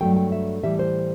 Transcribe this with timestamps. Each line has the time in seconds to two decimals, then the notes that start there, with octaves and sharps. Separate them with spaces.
0.01 G2 F#3 A3 G5
0.17 G5
0.32 E5
0.63 A2 E3 G3 E5
0.79 C5